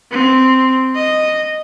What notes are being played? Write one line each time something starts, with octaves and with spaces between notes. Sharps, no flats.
C4
D#5